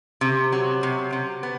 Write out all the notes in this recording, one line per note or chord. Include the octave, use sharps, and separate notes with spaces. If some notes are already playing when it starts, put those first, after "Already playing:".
C3
F#3
C3
C3
B3